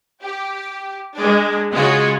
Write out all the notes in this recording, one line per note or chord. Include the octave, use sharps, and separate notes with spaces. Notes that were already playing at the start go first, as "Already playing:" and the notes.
G4
G#3 D4
C#3 G#3 F4 F#4